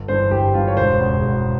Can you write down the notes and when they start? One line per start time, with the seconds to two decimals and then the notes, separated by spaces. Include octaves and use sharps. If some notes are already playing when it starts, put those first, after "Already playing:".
Already playing: G1
0.08 G2 E3 C5
0.31 G1 G4
0.54 G2 E3 F4
0.68 C#5
0.77 E1 C5
0.99 E2 C#3
1.22 E1